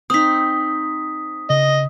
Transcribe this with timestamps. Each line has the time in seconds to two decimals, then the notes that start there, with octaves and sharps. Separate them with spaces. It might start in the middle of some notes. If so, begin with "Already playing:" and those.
0.10 C4 D#4 D#6 B6
1.50 C#3 D#5